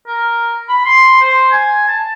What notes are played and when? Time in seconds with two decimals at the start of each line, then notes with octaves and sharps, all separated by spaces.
0.07 A#4
0.69 B5
0.85 C6
1.21 C5
1.52 G#5
1.88 A5